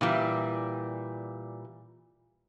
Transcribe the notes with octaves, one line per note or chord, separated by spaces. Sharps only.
A#2 E3 G3